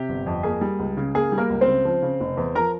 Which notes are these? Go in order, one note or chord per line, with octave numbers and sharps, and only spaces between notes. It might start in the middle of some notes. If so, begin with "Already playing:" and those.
Already playing: C3 G4
G1
F2
A#3 G#4
G3
C#2
C#3
A#3 G#4
G3
A#3 A#4
C#2
C4 C5
C#3
F3
C#3
F1
E2
F3 A#4 A#5